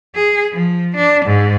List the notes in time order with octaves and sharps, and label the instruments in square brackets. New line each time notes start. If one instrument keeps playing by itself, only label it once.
[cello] G#4
F3
D4
G#2